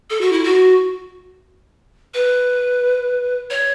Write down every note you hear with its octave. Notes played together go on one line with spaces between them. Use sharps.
A4
F#4
E4
F#4
B4
C#5